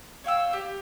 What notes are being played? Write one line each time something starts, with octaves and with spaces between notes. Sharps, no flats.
C#5 F5 G5 E6
G4